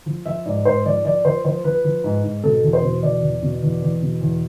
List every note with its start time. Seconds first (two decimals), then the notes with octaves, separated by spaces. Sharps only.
0.06 F3
0.26 F3 E5
0.46 G#2 D5
0.65 G#2 C5
0.85 F3 D5
1.05 F3 D5
1.25 F3 C5
1.45 F3 C5
1.64 F3 B4
1.84 F3
2.04 G#2
2.24 G#2
2.44 B2 A4
2.63 E2
2.73 C5
2.83 B2
3.03 E2 D5
3.23 E2
3.43 B2
3.62 E2
3.82 E2
4.02 B2
4.21 E2